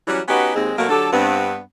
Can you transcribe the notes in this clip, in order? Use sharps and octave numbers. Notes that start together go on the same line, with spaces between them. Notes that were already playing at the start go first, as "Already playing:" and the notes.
E3 F#3 G3 C#4
B3 C#4 D#4 F#4 G4 B4
D#2 G#3 C4
B2 F#3 A3 A#3
D3 F#3 G4 A4
G2 B3 C4